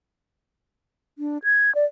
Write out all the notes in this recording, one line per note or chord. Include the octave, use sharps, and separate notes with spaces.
D4
G#6
D5